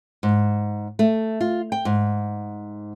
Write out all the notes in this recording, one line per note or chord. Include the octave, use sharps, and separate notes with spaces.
G#2
A3
F4
G5
G#2